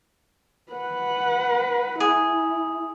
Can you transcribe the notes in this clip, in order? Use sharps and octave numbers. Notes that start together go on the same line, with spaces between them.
B4 F#5
E4 G#4